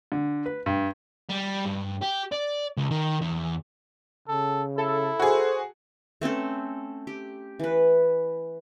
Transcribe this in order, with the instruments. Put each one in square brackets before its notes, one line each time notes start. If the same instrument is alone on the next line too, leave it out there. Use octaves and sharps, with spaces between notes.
[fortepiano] D3
B4
G2
[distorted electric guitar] G3
G2
G4
D5
C#2
D#3
E2
[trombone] C#3 [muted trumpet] A4
[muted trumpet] E4 [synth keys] A4
[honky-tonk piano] F#4 G#4 [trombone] C5
[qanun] A3 C4 C#4 A4
G4
E3 B4